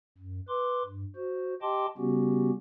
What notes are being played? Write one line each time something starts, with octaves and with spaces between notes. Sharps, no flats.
F#2
B4 C6 D6
G2
F#4 C5
G4 D#5 G5 A5 C6 D6
C#3 G3 B3 C#4 F#4 G4